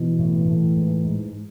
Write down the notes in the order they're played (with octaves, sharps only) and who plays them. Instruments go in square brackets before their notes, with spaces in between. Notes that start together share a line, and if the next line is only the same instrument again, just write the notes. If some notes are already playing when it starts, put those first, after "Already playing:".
Already playing: [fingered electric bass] B2 [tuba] E3
[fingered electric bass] A2
A2
G#2
G#2